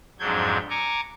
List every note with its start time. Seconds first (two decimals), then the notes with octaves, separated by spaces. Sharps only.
0.19 F2 G#2 F#3 D4 G6 G#6
0.70 G#5 A#5 C#6 D6